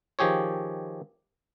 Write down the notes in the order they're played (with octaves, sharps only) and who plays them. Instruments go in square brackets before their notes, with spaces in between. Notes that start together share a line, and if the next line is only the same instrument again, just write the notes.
[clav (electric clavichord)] D#3 F3 G4 G#4 C#5